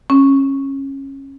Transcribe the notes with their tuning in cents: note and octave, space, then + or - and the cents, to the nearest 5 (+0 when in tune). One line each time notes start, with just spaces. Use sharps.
C#4 -20